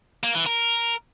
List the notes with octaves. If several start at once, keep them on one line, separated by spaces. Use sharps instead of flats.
A#3
E3
A#4